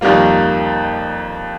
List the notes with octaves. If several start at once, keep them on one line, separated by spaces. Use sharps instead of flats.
F2 D#3 G3 A#3 F4